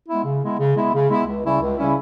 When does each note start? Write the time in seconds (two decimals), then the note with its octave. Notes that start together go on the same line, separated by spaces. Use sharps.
0.09 G#3 B3 E4
0.25 C#3
0.42 G#3 B3 E4
0.58 C#3
0.76 G#3 B3 E4
0.93 C#3
1.10 G#3 B3 E4
1.26 C#2
1.44 C#3 G3 C#4 E4
1.60 C#2
1.77 C#3 G3 C#4 E4